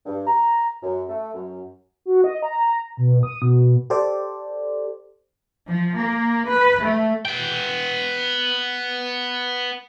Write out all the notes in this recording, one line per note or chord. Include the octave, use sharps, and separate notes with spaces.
G2
A#5
F#2
A3
F#2
F#4
D#5
A#5
B2
D#6
B2
G4 A4 C5 D5
F3
A#3
B4
A3
B3 G5